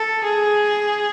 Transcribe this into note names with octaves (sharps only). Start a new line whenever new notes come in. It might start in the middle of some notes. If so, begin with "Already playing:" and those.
Already playing: A4
G#4